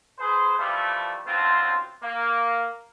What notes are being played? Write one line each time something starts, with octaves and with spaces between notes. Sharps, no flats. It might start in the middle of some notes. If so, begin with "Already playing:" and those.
G#4 B4 C5
E3 F3 G3 A3
A1 D2 C4 F4 C5
A#3